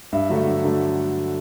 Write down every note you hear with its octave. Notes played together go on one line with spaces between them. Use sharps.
G2 E5
D3 F#3 A3
G2
D3 F#3 A3